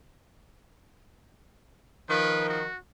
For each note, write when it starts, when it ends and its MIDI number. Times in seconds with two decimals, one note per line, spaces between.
2.10 2.65 51
2.10 2.65 53
2.10 2.48 71
2.49 2.77 66